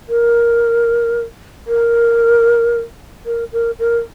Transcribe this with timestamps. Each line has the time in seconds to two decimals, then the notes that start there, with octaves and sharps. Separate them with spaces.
0.09 A#4
1.67 A#4
3.26 A#4
3.53 A#4
3.79 A#4